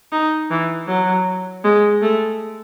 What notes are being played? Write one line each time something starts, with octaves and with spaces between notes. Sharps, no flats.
D#4
E3
F#3
G#3
A3